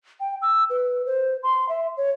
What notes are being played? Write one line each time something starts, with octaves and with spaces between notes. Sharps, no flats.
G5
E6
B4
C5
C6
E5
C#5